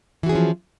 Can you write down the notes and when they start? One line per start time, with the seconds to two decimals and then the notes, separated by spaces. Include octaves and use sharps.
0.23 E3
0.26 F#4
0.29 G#4
0.32 C#4
0.35 F3